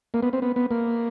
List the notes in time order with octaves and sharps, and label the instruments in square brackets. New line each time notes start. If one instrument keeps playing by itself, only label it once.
[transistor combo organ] A#3
B3
C4
B3
B3
A#3